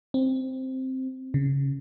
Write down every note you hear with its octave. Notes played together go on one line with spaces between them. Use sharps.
C4
C#3